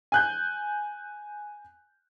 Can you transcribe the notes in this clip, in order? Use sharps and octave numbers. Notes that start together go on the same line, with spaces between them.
G#5 F#6 G6